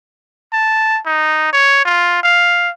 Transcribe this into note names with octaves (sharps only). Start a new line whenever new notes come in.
A5
D#4
C#5
F4
F5